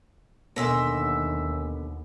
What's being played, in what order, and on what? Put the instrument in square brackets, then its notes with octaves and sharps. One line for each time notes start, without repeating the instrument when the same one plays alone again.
[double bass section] D#2 [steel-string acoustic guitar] B2 D3 [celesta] A#4 G#5 [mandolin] D#5 E5 C6